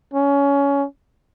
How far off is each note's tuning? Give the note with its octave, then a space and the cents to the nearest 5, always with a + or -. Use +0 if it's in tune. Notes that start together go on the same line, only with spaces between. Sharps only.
C#4 +20